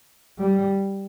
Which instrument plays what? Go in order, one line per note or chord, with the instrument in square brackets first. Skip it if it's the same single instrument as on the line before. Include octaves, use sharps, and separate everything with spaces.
[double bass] G3